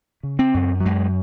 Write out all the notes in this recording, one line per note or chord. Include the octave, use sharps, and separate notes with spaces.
C#3
C4
F#2
F#3
F#2 G#3